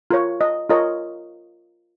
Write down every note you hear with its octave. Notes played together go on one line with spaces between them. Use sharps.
F4 A#4 C#5
D#5
F4 A#4 C#5 D#5